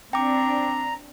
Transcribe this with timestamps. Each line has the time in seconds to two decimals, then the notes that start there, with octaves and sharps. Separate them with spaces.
0.13 C4 D4 G5 A#5 D6